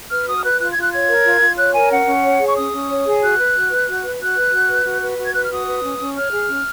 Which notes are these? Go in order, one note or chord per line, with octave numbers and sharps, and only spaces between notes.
B4 F6
F#4 D#6
F6
B4 F#6
F4 F#6
G#6
F4 F#6
C#5 G#6
A#4
F4
F4
C#5 F#6
A#4 G#5
C#4 F#5
C#4
C#5
G#4
C#6
C#4 D#6
C#4
C#5
G#4
F#4 F#6
B4
F#4
B4
F#4
B4
F#4 F#6
B4
F#4
B4
F#4
B4
F#4
G#6
B4 F#6
F6
F#4 D#6
B4
C#4
C#4
C#5 F6
G#4
C#4